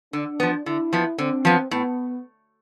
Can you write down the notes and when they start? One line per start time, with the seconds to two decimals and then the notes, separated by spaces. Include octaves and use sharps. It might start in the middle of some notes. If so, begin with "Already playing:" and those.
0.13 D3 D4
0.40 F3 B3
0.66 D3 E4
0.93 F3 B3
1.18 D3 C4
1.45 F3 B3
1.71 A2 B3